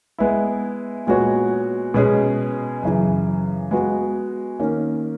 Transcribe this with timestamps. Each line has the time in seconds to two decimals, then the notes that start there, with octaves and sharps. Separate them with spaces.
0.19 G#3 B3 E4
1.07 A#2 G#3 B3 F#4 C#5
1.94 B2 G#3 C#4 G#4
2.82 F#2 C#3 E3
3.71 G#3 B3 F#4
4.59 D#3 A#3 C#4